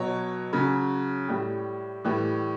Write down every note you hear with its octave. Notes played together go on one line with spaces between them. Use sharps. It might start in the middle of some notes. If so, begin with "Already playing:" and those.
Already playing: B2 F#3 C#5
C#3 F#3
A2 G3
A2 E3 G3